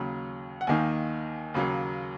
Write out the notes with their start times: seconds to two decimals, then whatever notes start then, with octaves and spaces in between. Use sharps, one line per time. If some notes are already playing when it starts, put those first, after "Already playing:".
Already playing: D#2 C#3 F#3
0.61 F#5
0.67 D#2 D#3 A#3 D#4 G#5
1.54 D#2 C#3 F#3 A#3